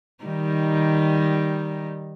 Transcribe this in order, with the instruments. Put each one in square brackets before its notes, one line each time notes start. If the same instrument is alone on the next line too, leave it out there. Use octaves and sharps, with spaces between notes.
[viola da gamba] D#3 G3 D#4